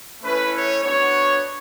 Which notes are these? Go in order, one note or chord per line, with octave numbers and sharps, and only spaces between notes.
A3 C#4 E4 B4
C#5
B3 D4 F#4 C#5